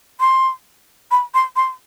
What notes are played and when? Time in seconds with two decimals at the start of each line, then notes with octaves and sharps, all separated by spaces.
0.20 C6
1.11 B5
1.34 C6
1.56 C6